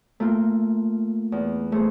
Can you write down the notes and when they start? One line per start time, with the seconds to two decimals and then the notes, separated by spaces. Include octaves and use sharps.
0.20 A3 A#3 F4
1.32 E2
1.72 A3 G#4 C5